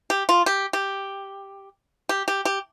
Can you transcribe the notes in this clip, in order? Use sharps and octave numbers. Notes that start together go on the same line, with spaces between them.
G4
F4
G4
G4
G4
G4
G4